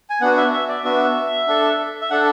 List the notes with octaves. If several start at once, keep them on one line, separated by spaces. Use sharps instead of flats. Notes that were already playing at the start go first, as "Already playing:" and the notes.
G#5
B3 D4 F#4 F#5
E5
E5
D5
B3 D4 F#4 E5
D4 A4
E5
D4 A4 F#5